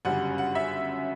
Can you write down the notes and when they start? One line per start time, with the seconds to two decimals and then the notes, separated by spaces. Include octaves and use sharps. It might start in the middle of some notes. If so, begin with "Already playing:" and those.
0.05 G1 F#2 C#3 G3 F#5
0.38 F#5
0.55 E5